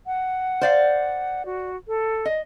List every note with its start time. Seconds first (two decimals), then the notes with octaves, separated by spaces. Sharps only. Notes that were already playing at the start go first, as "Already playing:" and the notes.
0.06 F#5
0.62 C5 D5 F5
1.45 F#4
1.88 A4
2.25 D#5